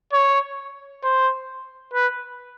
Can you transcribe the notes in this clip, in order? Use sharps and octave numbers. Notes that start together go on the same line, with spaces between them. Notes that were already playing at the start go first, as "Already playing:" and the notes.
C#5
C5
B4